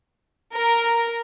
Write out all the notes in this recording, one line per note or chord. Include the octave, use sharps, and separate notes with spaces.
A#4